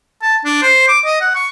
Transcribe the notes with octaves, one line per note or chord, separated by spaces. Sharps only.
A5
D4
C5
D6
D#5
F#5
C#6